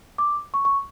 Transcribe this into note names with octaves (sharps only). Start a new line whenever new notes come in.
D6
C#6
C#6